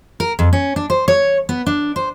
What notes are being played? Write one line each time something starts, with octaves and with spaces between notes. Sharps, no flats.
A#4
F2
C#4
D4
C5
C#5
B3
D4
C5